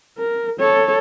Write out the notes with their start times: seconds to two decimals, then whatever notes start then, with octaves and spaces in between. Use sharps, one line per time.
0.18 A#4
0.60 A4 C#5